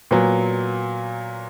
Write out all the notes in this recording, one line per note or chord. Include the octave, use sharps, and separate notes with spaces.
A#2 F#3 B3